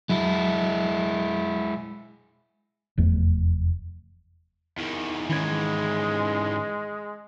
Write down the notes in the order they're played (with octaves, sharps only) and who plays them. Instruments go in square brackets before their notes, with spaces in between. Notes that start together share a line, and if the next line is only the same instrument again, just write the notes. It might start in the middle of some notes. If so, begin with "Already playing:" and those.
[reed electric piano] F#3 [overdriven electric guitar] G#3 E4
[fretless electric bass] F1 E2 A3
[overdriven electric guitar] E2 D#3
[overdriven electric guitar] G#2 E3 [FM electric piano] D#3 C#4 G#6 [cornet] G#3